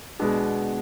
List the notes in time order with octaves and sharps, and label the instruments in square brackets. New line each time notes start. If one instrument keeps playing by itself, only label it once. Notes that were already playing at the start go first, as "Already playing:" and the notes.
[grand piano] B2 G#3 B3 D4 G#4